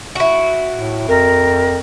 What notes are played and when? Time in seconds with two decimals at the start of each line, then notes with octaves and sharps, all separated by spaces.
0.15 E4 F#4
0.72 A2
1.08 F2 A#4